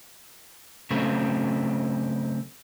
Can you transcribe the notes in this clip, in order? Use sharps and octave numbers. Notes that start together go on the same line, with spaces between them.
C#3 F#3 A3 C4